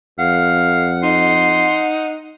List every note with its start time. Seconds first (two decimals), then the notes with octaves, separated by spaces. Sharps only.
0.19 F2 F5 F#5
1.03 D#4 C6